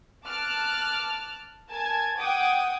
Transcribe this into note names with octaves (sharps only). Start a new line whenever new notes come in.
A5 D6 F6 F#6
A#4 G#5 A5 G#6
F#5 G5 D6 D#6 G#6